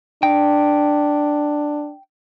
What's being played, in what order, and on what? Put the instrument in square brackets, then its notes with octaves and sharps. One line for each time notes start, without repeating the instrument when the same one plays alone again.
[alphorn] D4 [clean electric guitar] G5